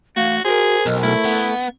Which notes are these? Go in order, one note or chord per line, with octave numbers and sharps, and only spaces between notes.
E3 A3 F#4 F5
F#4 G#4 A#4 C5
B1 D#5
A3 E4
B3